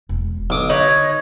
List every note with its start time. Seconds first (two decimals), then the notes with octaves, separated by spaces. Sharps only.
0.09 E1
0.50 B1 D3 D6 D#6
0.70 D#4 B4 C#5 D#5 G#6